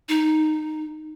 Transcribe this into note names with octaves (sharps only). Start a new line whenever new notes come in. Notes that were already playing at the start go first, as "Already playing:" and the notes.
D#4